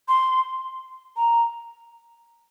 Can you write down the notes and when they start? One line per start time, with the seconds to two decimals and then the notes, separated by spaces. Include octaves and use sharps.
0.08 C6
1.16 A#5